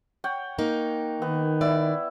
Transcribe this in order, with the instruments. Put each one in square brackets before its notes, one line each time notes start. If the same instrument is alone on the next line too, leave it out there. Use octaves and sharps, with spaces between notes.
[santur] C#5 F#5 G5
[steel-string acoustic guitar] A#3 D#4
[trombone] D#3 [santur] B3
[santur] E4 [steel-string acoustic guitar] D5